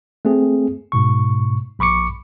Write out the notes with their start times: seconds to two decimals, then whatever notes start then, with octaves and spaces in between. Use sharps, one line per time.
0.25 A3 C4 G#4
0.92 G#2 B2 C#6
1.79 A#1 B5 C#6 D6 C#7